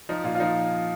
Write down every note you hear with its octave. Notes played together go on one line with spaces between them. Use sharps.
F3 D#4
A#2 F4
F4
F3 D#4